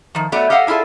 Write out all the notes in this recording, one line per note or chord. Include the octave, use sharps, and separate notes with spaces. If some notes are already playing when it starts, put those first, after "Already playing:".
D#3 F3
F#3 A3 B3 D5
G4 A4 D#5 F5 F#5
D4 E4 F4 G#4 A4